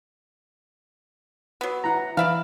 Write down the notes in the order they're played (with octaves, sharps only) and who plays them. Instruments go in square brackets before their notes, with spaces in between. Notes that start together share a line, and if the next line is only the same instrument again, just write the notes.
[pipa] F#3 B3
[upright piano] E3 F#5 [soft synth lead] A#5
[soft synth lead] E3 [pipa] D5 E5 F5 [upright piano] B5